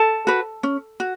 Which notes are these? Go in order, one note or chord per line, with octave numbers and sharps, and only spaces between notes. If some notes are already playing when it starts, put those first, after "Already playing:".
Already playing: A4 A5
F#4 B4
C#4
F#4